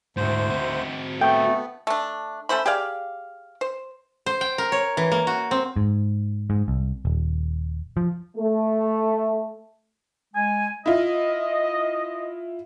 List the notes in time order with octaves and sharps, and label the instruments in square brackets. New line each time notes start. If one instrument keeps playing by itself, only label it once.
[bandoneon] D2 C5 [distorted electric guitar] G#2 A3
[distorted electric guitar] C4 F#4
[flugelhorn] A3 [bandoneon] B3 [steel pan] G5
[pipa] A3 D4
A3 C#4 C5 B5
G4 G#4 D5 F5
C5
[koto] C5
G5
A#4
C#5
E3
A#3
F#4
C4
[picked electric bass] G#2
G#2
C2
D#1
F3
[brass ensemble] A3
[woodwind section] G#3 G#5
[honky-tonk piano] E4 F4 [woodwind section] D#5